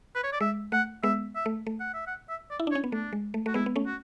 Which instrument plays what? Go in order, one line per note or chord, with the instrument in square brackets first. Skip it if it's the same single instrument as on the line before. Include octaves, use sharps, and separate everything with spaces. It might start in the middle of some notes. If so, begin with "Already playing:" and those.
[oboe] B4
C#5
D5
[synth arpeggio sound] G#3 [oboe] E5
[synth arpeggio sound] A3 [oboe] F#5
[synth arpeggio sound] G#3 B3 [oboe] E5
[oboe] E5
[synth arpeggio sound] A3
A3
[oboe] F#5
E5
F#5
E5
D5
[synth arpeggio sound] E4
D4
[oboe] C#5
[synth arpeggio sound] C#4
B3
[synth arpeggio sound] A3 [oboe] D4
[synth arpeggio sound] G#3
A3
[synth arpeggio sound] A3 [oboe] F#4
[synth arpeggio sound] G#3 B3 [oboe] E4
[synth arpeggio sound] B3
A3 C#4
[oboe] F#4